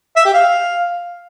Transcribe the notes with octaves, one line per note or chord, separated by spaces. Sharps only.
E5
G4
F5